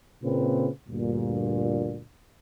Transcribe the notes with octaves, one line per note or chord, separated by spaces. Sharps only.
A#2 C#3 A#3 C4 B4
D2 G2 A#2